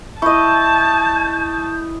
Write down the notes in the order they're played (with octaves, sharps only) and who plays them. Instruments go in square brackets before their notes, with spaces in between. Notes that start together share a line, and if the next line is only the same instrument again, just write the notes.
[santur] E4 D#5 [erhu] A5 [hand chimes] C#6 [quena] G6